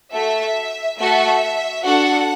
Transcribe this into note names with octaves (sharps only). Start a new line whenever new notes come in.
A3 F#4 A4 E5
A3 F#4 A4 E5
D4 F#4 A4 F#5